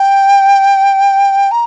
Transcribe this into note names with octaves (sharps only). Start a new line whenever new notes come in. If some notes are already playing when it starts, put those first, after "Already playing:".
Already playing: G5
A#5